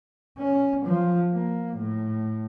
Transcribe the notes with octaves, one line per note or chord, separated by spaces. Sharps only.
C#4
F3
A#3
A2